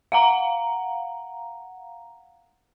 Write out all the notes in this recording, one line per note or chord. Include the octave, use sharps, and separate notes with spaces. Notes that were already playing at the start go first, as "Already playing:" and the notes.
F5 F#5 A#5